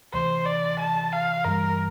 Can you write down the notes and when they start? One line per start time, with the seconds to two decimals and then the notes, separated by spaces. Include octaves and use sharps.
0.13 D2 C3 E3 A3 C5
0.46 D5
0.80 A5
1.12 F5
1.44 G2 E3 G3 A#4